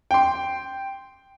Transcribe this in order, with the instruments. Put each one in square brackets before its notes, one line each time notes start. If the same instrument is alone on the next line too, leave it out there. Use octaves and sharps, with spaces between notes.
[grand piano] G5 C6